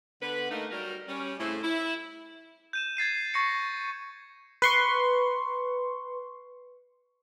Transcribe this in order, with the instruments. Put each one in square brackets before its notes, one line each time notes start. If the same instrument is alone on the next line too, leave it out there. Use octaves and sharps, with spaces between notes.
[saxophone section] D3 B3 B4
A3 A#3 D#4
F#3 G3 A#4
G3 C#4
A2 C#3 A3 C4 E4 A4
E4
[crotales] G6 D#7 E7
G#6 A6 C7 D#7
C#6 A6 A#6 C7 C#7
[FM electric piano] B4 C6 C#6